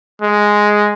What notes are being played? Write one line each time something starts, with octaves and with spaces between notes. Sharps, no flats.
G#3